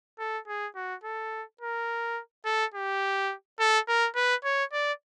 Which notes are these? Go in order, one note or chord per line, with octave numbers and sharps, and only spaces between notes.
A4
G#4
F#4
A4
A#4
A4
G4
A4
A#4
B4
C#5
D5